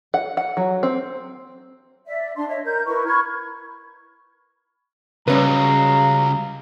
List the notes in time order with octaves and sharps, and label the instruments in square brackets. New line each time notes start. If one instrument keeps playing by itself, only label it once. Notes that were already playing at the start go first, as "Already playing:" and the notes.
[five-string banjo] F#5
F#5
F#3
C4
[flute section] D5 E5
D4 C6
C#5 D#5 E5
A#4 G6
E4 A#4 B4 C#6
B5 C#6 F6 G#6
[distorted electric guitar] C#2 [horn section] F#3 F5 A#5 [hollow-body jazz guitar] G3 C#4 B4